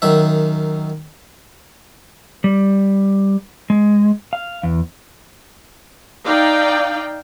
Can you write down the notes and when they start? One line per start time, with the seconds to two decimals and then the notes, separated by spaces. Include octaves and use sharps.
0.02 F#2 D#3 E5
2.44 G3
3.70 G#3
4.33 F5
4.63 E2
6.25 D#4 D5 F5 G5